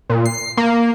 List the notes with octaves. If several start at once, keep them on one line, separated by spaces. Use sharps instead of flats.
A#2
C7
A#3